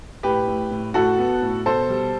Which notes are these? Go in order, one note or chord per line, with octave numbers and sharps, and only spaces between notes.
A2 G4 B4
A2
A2
A2 F#4 A4
B3
A2
B2 A4 C5
G3